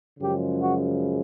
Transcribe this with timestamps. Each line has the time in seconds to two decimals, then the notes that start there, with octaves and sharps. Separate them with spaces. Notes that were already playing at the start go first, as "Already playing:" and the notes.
0.20 F#2 C#3 F3 G#3 G4
0.61 F#4